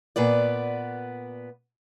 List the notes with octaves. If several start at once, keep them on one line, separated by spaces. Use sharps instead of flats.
A#2 B3 B4 D5